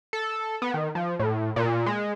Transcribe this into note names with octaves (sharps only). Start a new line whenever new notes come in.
A4
B3
D#3
F3
A2
A#2
G#3